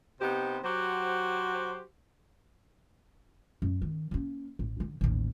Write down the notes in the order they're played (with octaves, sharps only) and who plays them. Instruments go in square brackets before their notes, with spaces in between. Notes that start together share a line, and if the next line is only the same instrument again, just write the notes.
[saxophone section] C3 B3 D#4 G4 C5
F#3 F#4 G4 C5
[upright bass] F#2
D#3
A#3 C#4
A1
D3
A1 D#2